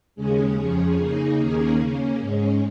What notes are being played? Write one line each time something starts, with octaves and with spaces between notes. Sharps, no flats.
D#2 C#3 G#3 C#4 G#4
F2 C#3 F3 C#4 G#4
C#3 A#3 D#4 G#4
D#2 D#3 A#3 C#4 G#4
C#3 A#3 C#4
G#2 G#3 C#4